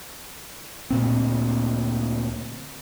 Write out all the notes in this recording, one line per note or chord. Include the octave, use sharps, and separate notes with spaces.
D2 A#2 C4